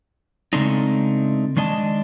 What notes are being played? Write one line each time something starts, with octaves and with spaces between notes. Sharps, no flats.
C#3 G#3 A3 C4 D4 D#4
D#3 G#3 D4 D#5 G#5 A5